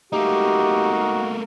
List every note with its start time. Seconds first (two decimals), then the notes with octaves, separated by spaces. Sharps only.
0.13 A3 A#3 D#4 F#4 G4